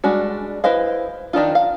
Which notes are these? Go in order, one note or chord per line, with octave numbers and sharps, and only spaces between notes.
G3 G#3 D4 F#4
E4 B4 C5 D#5 F5
D#3 D4 D#4 F4
F5